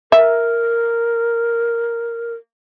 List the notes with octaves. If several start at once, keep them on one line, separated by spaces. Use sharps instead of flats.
A#4 E5